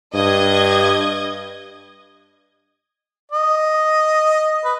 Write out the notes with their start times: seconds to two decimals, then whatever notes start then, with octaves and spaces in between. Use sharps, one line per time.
0.14 G2 D#5 G#6
3.32 D#5
4.65 B4